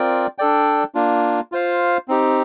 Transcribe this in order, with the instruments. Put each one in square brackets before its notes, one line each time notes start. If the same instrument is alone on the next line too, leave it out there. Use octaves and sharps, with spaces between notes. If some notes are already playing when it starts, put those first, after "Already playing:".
Already playing: [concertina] C4 F4 A#4 D5 G5
D4 A4 D5 G5
A#3 D4 F4
F4 C5 F5
C4 D#4 G4